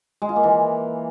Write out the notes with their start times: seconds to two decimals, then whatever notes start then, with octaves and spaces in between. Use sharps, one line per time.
0.22 G#3
0.29 F4
0.36 A#3
0.43 E3